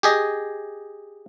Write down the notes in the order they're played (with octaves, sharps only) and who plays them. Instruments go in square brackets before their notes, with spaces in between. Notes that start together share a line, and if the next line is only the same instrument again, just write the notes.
[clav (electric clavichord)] G4 G#4 D#5